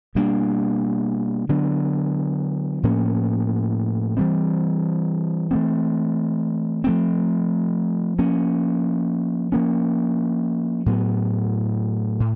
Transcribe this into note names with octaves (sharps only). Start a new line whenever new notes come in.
B2 G3 A#3 D4
D3 F#3 B3 D4
A2 F3 A#3 C#4
E3 G3 C4
E3 A3 C4
F3 A3 C4
F3 A#3 C#4
F3 A#3 C#4
A2 F#3 B3
A2